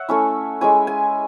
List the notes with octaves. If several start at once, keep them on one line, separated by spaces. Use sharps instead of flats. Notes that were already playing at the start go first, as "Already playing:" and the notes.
Already playing: C#5 E5 F#5
A3 C#4 E4
G#3 C#4 E4 G#5
G#5